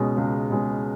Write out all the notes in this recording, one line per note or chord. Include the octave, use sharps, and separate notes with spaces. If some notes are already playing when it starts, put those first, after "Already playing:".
Already playing: C#2 B2 G#3 C#4
C#2
B2 G#3 C#4